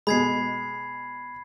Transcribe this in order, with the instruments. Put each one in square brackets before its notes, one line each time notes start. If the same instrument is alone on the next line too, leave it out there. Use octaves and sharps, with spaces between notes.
[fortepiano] B2 G#3 [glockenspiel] B5 G#6 C7